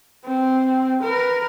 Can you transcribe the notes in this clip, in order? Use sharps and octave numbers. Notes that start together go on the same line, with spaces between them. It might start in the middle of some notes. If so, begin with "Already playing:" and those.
C4
A#4 B4